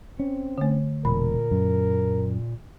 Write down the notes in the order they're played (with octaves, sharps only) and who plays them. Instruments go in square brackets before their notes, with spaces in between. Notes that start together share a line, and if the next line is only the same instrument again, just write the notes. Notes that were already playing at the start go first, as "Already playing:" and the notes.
[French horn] C4 [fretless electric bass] C#4
[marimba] D3 A3
[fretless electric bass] E1 [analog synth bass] A#2 [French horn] A#4 [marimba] B5
[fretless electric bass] F#2